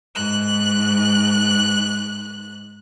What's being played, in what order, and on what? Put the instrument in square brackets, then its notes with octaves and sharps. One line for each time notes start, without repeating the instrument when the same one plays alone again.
[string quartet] G#2 F#6